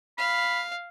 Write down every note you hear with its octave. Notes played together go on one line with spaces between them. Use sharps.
F5 B5